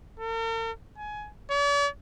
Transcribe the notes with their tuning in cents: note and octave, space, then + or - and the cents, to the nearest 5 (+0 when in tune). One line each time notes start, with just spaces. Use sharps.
A#4 -45
G#5 +20
D5 -45